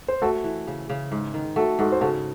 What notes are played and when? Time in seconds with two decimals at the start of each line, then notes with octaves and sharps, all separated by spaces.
0.08 C5
0.22 A3 F#4 A4
0.44 E3
0.67 C#3
0.90 C#3
1.12 G#2
1.34 D#3
1.56 A3 F#4 A4
1.79 G#2 F#4 A4
1.92 C5
2.01 C#3 F#4 A4